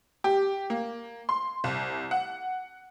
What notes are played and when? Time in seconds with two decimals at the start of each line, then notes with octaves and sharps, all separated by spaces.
0.24 G4
0.70 A#3
1.29 C6
1.64 C2
2.11 F#5